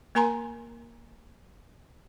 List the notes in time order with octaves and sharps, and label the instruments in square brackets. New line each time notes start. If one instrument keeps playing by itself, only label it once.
[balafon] A#3 A#4 G#5 A#5 C6